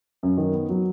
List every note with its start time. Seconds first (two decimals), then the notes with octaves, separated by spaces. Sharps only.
0.23 F#2
0.37 D#3
0.54 B3
0.69 F#3